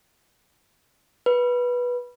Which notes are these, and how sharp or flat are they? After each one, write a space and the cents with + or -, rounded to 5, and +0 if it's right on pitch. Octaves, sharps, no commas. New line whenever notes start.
B4 -15